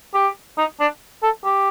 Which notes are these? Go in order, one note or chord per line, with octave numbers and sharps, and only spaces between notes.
G4
D#4
D4
A4
G4